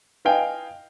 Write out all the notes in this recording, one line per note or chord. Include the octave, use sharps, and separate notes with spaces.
B4 D#5 F5 G5 G#5